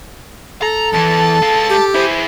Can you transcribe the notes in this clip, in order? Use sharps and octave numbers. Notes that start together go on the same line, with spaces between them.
A4 A#5
E2 E3 A5
G#3 F5
G4
E4 G#4 C5